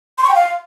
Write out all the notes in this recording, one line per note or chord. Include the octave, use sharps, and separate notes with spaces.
C6
C#6
G5
F5